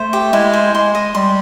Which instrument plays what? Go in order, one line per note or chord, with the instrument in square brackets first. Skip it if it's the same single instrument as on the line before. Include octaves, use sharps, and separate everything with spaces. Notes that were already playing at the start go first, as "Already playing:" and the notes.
Already playing: [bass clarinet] A3 [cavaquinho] C5
[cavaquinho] G4
[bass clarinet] G#3 [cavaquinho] E4
[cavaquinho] C5
[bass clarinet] G#3 [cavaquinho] C6
[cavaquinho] D#5
[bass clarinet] G3 [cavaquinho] C6